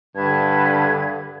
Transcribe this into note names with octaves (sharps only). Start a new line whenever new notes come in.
G2 D3 B4 A5 G#6